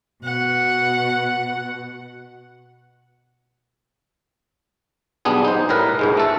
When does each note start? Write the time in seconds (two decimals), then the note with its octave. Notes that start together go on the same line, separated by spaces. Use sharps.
0.24 B2 F#5
5.25 B1 G3 B3 D4 G#4
5.45 D#4 C5
5.69 A2 G3 A#4 B4
5.99 C#2 G#2 G#3
6.17 A3 A4